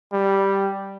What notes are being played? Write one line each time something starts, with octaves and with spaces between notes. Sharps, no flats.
G3